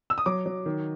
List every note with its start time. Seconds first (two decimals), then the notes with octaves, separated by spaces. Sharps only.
0.10 E6
0.18 D#6
0.26 F#3 D6
0.46 F#3
0.66 D#3